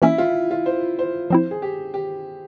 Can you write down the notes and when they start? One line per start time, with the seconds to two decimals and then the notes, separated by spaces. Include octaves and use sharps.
0.02 E3 A#3 C#4 E4
0.18 F4
0.51 F4
0.66 C5
0.99 C5
1.30 F3 C4 E4 C5
1.51 G#4
1.62 G4
1.94 G4